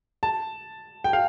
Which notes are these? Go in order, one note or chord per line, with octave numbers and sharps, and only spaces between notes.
A5
G5
F5